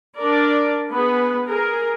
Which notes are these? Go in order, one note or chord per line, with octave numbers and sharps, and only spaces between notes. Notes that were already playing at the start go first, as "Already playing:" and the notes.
D4 A#4 D5
B3 G#4 B4
G#4 A#4